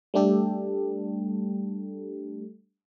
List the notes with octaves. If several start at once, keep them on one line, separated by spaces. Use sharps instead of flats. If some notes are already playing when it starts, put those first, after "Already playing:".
G3 A3 D4 G4 A4